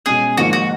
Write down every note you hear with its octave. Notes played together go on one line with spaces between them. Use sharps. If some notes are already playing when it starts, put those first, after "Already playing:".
B2 G#3 C#4 G#4
G#1 G#2 F3 A#3 F#4
F#4